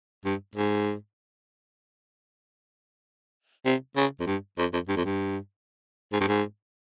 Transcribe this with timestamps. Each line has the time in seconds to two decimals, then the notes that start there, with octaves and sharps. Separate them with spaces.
0.25 G2
0.56 G#2
3.65 C3
3.97 C#3
4.20 F2
4.27 G2
4.58 F2
4.73 F2
4.89 G2
4.97 F2
5.05 G2
6.13 G#2
6.21 G2
6.28 G#2